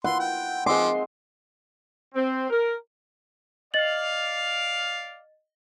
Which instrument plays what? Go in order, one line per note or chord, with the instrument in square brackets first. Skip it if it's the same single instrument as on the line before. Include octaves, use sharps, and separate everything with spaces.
[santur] E4 F4 [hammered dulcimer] F#5 [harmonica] C6
[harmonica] G5
[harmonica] F3 D6 [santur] G#3 C4 D#5 [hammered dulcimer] C6
[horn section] C4
A#4
[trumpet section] D5 F5 [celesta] D#5 A6 F#7